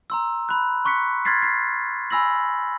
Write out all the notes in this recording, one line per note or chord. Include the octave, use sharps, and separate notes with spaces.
A#5 C6 E6
B5 F#6
C6 C#6 F#6 B6 C#7
C6 F6 G#6 A6 B6 C7
B6 C7
G#5 B5 E6 A#6 F#7